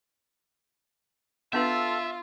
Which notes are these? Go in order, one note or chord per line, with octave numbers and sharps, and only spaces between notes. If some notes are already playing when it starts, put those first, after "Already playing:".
B3 D4 F4 A4 B4 E5